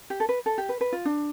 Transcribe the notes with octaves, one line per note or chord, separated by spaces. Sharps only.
G4
A4
B4
A4
G4
B4
B4
F4
D4